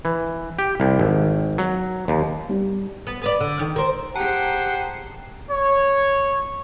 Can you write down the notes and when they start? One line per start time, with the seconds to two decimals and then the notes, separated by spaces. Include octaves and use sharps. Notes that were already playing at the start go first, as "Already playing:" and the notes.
0.05 E3
0.59 G4
0.80 C2
0.99 G#1
1.58 F#3
2.08 D#2
2.49 G3
3.07 B3
3.22 B3 B4 D5
3.40 D3
3.59 D#3
3.76 A#4 C5
4.15 G4 G#4 C5 F#5 G5 A5 A#5
5.50 C#5